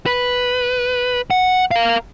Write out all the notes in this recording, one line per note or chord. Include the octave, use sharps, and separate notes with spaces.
B4
F#5
A#4 F5